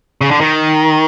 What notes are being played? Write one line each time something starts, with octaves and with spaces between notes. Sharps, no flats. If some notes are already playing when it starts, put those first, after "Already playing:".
C#3
D3
D#3